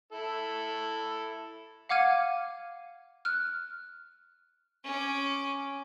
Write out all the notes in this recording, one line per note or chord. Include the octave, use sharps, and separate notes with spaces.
E4 A4
F5 F#5 D6 F6 G#6 D#7
F6 F#6
C#4 D6